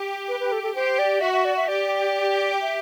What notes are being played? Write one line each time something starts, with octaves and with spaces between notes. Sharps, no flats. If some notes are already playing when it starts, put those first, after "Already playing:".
Already playing: G4
B4
B4
A4
A4
G4 C5
D5
F#4 E5
E5
D5
E5
G4 D5
E5